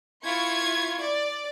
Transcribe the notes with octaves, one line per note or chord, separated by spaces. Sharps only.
E4 F4 C#6 G#6
D5